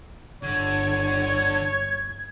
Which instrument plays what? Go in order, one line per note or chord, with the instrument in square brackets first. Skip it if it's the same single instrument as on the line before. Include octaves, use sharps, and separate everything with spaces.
[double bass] G1 [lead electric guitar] D3 [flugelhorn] C#5 [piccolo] G#6